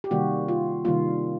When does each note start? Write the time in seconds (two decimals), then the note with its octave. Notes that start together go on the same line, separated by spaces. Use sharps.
0.04 G4
0.11 C3 D#3 G3 A#3 F#4
0.48 F4
0.85 C3 D#3 G3 A#3 F4